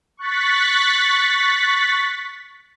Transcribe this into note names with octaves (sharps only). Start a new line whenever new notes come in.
C#6 F#6 A6 B6